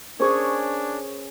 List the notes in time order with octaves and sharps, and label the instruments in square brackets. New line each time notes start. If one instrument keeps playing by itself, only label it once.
[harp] C#4 G#4 C#5 [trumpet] D4 [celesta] A#4 C5 C#6